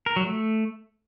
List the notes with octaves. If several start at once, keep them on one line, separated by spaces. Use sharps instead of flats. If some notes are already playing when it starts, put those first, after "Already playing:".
A#4
F#3
A3